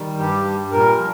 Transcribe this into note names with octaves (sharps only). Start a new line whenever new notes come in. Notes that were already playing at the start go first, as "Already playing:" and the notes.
Already playing: D#3 G3
G2 G4
G3
A#2 A#4
F3